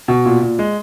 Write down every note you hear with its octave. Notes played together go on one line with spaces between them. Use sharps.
B2
A#2
A#2
G#3